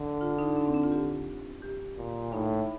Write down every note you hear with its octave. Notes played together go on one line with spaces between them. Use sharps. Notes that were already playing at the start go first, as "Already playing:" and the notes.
Already playing: D3
F4
D#4
D4
C4
D4
F4
G4
G4
A#2
A2 D#4